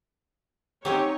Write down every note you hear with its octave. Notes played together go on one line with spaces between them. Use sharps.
F#3 C4 C#4 D#4 G4 C#5